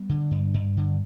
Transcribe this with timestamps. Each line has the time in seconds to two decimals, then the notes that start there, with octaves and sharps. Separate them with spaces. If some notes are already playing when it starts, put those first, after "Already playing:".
Already playing: G3 B3
0.09 D3
0.31 G2
0.54 G2
0.77 D3